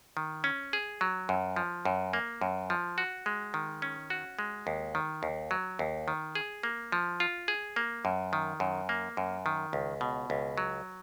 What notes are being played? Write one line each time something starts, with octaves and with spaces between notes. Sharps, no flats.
D#3
C#4
G#4
F#3
F#2
F3
F#2
A#3
F#2
F3
F#4
G#3
D#3
C#4
F#4
G#3
D#2
D#3
D#2
F#3
D#2
D#3
G#4
A#3
F3
F4
G#4
A#3
F#2
D#3
F#2
A#3
F#2
D#3
C#2
B2
C#2
F#3